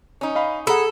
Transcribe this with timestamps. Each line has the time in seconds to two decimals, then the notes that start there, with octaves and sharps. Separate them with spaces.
0.21 C#4 D#4
0.35 D#5 F5 B5
0.67 G#4 A4 F#5 A#5 B5